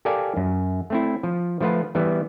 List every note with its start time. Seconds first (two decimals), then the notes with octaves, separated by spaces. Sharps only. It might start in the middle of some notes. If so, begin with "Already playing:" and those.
0.05 G4 A4 A#4 D5 F5 G#5
0.37 F#2
0.90 A3 C4 E4
1.23 F3
1.61 F3 A3 F4 B4 F#5
1.95 E3 G3 B3